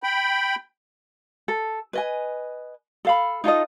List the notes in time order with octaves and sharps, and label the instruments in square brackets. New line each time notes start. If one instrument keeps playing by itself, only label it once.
[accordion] G5 B5
[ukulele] A4
B4 D#5 G#5
A4 F5 B5
D#4 F4 A4 D#5